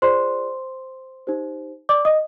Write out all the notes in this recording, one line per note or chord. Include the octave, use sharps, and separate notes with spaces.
F4 G#4 C5 D5 C6
D#4 G4 C5
D5 D6
D#5 D#6